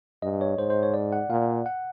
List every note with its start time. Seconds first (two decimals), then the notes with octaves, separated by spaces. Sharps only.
0.22 G2 D#5
0.41 C#5
0.58 G#2 C5
0.70 C5
0.83 C#5
0.94 D5
1.12 F#5
1.30 A#2 F5
1.66 F#5